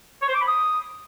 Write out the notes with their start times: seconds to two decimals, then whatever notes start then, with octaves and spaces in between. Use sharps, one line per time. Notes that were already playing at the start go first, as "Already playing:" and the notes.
0.22 C#5
0.28 C5
0.35 D6
0.41 B5
0.48 D#6